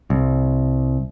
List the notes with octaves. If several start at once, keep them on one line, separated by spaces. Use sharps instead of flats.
C2